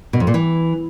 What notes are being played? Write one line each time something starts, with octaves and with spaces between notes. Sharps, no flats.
B2
F2
A#2
E3